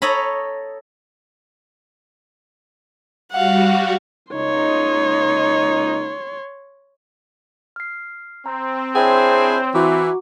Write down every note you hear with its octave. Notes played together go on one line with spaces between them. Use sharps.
A4 C#5 D#5 A#5 B5
G3 F#4 F5 F#5
C#2 A#3 D#4 C#5 C6
F6 C7
C4 A#5
D4 E4 G#4 C5 C#5 G5
E3 F#4 A#5 D6